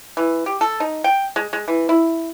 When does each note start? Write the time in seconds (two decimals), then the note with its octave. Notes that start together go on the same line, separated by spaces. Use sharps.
0.17 E3
0.46 G4
0.61 A4
0.80 D#4
1.04 G5
1.36 G#3
1.53 G#3
1.68 E3
1.89 E4